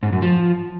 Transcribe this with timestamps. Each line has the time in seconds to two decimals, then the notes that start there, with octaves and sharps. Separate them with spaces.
0.03 G#2
0.12 F#2
0.22 F3